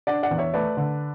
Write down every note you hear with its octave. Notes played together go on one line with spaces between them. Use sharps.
D4 D5 F#5
D5 F#5
E2
C#5 E5
A3 B4 D5
D3